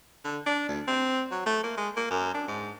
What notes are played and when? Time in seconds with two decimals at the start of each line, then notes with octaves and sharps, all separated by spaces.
0.24 D3
0.46 D4
0.69 D2
0.88 C4
1.32 F#3
1.46 A3
1.63 A#3
1.77 G#3
1.96 A#3
2.10 F#2
2.34 D4
2.48 G#2